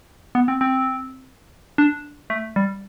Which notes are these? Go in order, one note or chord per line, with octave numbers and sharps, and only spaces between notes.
B3
C4
C4
D4
A3
G3